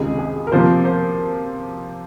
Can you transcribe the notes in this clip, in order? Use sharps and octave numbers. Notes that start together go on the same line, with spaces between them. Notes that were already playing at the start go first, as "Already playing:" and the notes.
Already playing: C#2 C3 D#3 G#4
G#4
A#4
C3 F3 A#3 C5
C5